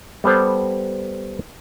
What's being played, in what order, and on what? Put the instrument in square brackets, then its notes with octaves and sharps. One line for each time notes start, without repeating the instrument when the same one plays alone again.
[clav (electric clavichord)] G3 B3 A4 C5